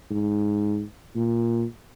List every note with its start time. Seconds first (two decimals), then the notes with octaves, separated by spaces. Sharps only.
0.11 G#2
1.16 A#2